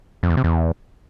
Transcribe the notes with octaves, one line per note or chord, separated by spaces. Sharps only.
F2
E2
C3
E2